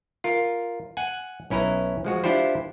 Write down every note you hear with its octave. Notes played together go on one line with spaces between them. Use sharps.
F4 A#4
F#5 G#5
B1 C#4 E4 B4 A#5
F3 G#3 F#4
D4 E4 F4 G4 C5